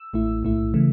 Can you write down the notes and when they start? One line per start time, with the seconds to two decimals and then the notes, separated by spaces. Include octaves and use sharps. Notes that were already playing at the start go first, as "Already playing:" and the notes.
Already playing: E6
0.13 A1 A2 A3 E4
0.43 B1 A2 A3 E4
0.74 C#3 E3 A3